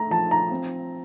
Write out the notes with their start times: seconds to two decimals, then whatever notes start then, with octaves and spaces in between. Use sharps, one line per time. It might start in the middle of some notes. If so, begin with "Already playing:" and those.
Already playing: A3 A#5
0.11 F3 A5
0.31 A#5
0.51 C4